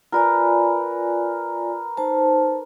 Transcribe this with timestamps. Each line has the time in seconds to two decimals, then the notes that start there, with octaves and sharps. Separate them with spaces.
0.12 F4 A#4 B4 D5 G#5
1.97 D#4 C5 A5